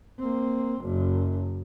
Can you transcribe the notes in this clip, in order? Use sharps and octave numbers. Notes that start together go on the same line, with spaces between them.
A#3 C4
F#1 F#2